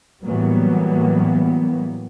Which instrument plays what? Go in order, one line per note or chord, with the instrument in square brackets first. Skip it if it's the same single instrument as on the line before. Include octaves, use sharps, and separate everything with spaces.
[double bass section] A2 E3 F#3 G3 A#3 B3